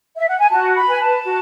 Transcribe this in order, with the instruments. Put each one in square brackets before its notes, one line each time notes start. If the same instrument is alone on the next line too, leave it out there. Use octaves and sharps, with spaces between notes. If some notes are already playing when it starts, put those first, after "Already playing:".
[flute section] E5
F#5
G#5
F#4 A5
B5
B4 G#5
A5
F#4